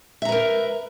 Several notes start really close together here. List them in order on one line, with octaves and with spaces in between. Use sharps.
E5 A#5 B4 A#4